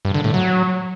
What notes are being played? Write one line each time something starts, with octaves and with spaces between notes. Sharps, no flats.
G2
D3
A2
F#3